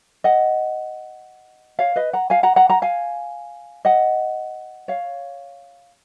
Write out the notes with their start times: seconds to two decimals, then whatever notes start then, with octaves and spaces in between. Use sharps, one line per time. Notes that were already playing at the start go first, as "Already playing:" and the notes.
0.24 D#5 F#5
1.79 C#5 F5
1.96 B4 D#5
2.13 F#5 A#5
2.30 F5 G#5
2.43 F#5 A#5
2.56 F#5 A#5
2.69 F#5 A#5
2.82 F5 G#5
3.85 D#5 F#5
4.88 C#5 F5